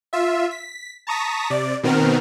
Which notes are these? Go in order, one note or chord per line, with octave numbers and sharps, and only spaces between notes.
F4 E5
B6
A5 A#5 C#6 D#6 A#6 B6
C3 D5
B2 D#3 B3 C4 A#4 F6